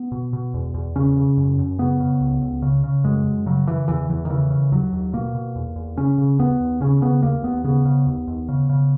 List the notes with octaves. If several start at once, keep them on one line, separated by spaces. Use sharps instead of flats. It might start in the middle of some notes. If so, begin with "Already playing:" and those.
Already playing: B3
B2
B2
E2
E2
C#3 C#4
C#3
F#2
F#2
C#3 B3
C#3
C#2
C#2
C#3
C#3
F#2 G#3
F#2
C#3 F#3
C#3 E3
E2 E3
E2 E3
D#3
C#3 E3
C#3
D#2 F#3
D#2
B2 A#3
B2
E2
E2
C#3 C#4
C#3
D#2 B3
D#2
C#3 C#4
C#3 B3
D#2 A#3
D#2 B3
C#3 B3
C#3
D#2
D#2
C#3
C#3